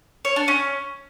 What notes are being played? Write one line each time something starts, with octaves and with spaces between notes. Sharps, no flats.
C#5
D4
C#4